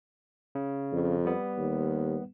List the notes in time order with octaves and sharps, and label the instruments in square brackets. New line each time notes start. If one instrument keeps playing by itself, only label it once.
[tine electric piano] C#3
[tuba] F2
[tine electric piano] G3 B3
[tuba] D#2